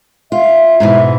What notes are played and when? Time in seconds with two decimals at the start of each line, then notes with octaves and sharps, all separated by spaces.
0.32 F4 E5
0.80 G#2 B2 E3